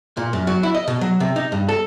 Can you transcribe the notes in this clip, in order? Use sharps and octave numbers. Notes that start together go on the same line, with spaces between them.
A#2
F#2
F#3
E4
D#5
B2
F#3
C3
D#4
G2
A4